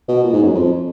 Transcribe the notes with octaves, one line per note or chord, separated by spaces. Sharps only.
B2
A#2
G#2
F#2
F2